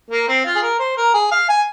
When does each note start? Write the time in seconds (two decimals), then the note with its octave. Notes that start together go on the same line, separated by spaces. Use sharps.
0.11 A#3
0.28 C4
0.45 F4
0.55 G#4
0.62 A#4
0.79 C5
0.97 A#4
1.14 G#4
1.31 F5
1.49 G#5